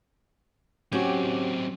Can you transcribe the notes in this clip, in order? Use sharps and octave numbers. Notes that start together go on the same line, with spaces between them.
F#3 C4 C#4 F#4 G4